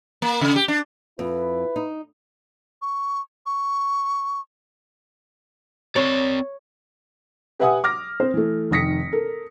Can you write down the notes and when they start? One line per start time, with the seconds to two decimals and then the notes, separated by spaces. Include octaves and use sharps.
0.22 A#3
0.41 C#3
0.56 G4
0.68 D4
1.19 F2 E4 B4
1.76 D#4
2.82 C#6
3.46 C#6
5.96 C4 C#5 D5
7.60 G4 B4 E5 F#5 G#5 D#6
7.84 D6 F6 A#6
8.20 C4 C5
8.34 E3 A3
8.71 F1 D#3 D#6 A#6 B6 C#7
9.13 A4 A#4